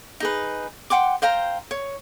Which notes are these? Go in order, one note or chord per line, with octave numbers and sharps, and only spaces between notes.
D#4 G#4 B4
F#5 G5 C6 D6
C5 F5 G5 A#5
C#5